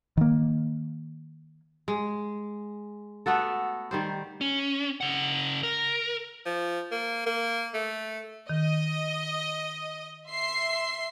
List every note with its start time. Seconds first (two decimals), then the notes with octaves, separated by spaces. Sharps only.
0.17 D#3 A#3
1.88 G#3
3.26 A3 B3 F#4 A4
3.91 D#3 G3 C5
4.41 C#4
5.01 C#3 F#5
5.63 A#4
6.46 F3
6.91 A#3
7.26 A#3
7.74 A3
8.49 D#3 D#5 D#6
10.28 E5 C6 C7